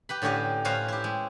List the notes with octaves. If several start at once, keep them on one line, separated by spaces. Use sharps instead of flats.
G4 B4 B5
A2 D3 C#4 G4 D#5
A2 C#4 B4 C5 F5 A#5
E4 G4
G#3